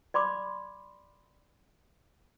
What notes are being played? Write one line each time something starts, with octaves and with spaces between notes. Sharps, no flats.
D5 B5 C6 D6